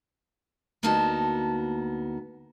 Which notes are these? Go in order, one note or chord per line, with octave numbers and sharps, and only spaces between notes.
D2 A#3 B3 D#4 F#4 A5